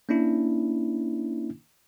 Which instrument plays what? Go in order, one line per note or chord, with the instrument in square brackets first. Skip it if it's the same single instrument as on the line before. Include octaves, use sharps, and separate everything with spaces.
[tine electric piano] A#3 C#4 D4 E4